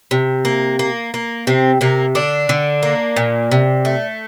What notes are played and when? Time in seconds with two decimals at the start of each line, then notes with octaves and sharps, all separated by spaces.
0.11 C3
0.45 A#3
0.79 A#3
1.14 A#3
1.47 C3 C4
1.81 C3 A#3
2.15 D3 D4
2.49 D3
2.83 A#3
3.16 A#2
3.52 C3
3.85 A3